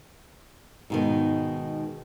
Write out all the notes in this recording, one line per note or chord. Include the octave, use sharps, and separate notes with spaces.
G#2 B2 D#3